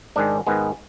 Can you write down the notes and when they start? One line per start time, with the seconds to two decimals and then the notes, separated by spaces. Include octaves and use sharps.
0.16 G#2 D#3 G#3 D4
0.47 G#2 D#3 G#3 B3